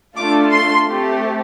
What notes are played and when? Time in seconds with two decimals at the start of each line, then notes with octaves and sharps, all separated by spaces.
0.17 A3 D4 F4 A4 D6
0.52 C6
0.87 A3 C4 G4